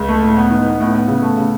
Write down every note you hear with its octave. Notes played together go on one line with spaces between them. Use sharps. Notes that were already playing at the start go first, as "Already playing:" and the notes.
Already playing: C#2
A3
A2
B3
D#3
B3
A2
B3
C#3
A3
C#3